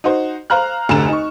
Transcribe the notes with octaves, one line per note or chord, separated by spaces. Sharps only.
D#4 F#4 C5
C5 F5 A#5 F6 F#6
F1 D2 D3 A4 A#5 E7
D#4 C#6